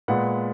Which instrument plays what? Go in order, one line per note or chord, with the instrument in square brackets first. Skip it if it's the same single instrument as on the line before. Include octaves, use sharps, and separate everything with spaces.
[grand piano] A#2 G#3 B3 F#5